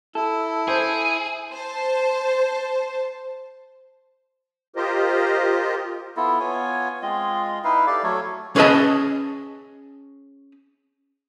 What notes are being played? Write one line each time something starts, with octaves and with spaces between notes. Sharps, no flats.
E4 A4
G#4 C5
C5 A5
F4 G4 A#4 C5 D#5
B3 E4 F4 A4
B3 F4 C#5 G#5
G#3 C4 F4 D#5
D#4 E4 B4 F5
G4 A4 D5 F5
F#3 A3 A4 C#5
C#4 G#4 B4 D#5 A5